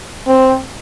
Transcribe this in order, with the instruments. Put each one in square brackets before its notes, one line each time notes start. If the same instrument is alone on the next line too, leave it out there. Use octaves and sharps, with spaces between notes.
[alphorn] C4